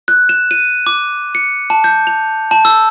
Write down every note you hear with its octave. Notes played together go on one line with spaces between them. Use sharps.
F#6
E7
D#7
D6
C#7
A5
G6
F7
A5
E6